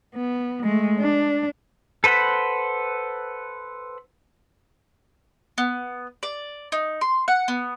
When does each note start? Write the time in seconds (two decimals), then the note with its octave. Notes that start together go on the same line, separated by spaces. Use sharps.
0.15 B3
0.64 G#3 A3
1.00 D4
2.04 A4 B4 C5 F#5 B5
5.58 B3
6.23 D5
6.72 D#4
7.01 C6
7.28 F#5
7.48 B3